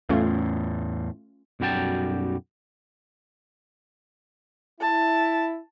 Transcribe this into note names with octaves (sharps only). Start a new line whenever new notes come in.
E2 A2 A3 C#4 F4
B1 F#2 G3 F#4 G5 A5
E4 A5